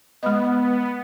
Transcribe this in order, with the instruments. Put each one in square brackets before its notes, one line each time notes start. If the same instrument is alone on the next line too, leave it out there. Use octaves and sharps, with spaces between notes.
[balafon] G#3 D#5 [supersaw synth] B3